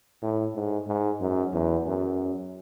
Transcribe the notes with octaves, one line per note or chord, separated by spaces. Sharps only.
A2
G#2
G#2
F#2
E2
F#2